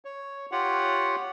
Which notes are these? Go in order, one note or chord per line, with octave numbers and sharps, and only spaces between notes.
C#5
F4 G4 C#5 F#5